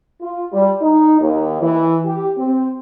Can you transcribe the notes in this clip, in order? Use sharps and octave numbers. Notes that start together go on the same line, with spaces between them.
F4
G3
D#4
D#2
E3
G4
C4